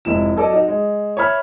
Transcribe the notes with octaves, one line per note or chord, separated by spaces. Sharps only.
F1 G#2 E4 E7
F#3 A4 D5 D#5
D#4 F#4
G#3
C#5 E5 B5 F6